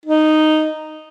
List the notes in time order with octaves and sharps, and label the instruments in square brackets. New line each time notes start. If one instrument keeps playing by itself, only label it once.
[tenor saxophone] D#4